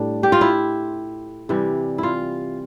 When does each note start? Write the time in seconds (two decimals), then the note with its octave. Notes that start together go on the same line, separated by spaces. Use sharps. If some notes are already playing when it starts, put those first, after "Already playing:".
Already playing: A2 G3 D4
0.23 G4
0.32 F4
0.41 E4
1.49 C3 E3 G3
1.98 E4 F4